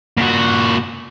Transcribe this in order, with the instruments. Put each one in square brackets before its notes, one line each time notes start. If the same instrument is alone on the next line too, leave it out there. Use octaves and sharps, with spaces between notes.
[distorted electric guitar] A#2 F#4